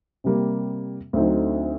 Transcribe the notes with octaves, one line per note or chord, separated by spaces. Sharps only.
C3 G3 A#3
D2 D3 F#3 C4 D#4